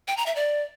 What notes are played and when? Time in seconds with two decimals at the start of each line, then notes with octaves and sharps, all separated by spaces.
0.08 G5
0.17 A#5
0.26 E5
0.36 D5